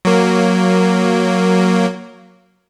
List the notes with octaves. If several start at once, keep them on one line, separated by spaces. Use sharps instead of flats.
F#3 A#3